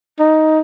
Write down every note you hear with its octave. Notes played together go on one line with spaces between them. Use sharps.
D#4